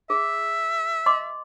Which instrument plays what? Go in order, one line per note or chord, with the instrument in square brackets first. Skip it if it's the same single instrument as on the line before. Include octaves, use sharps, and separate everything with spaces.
[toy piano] G#4 [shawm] E5
[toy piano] D#5 C6 D6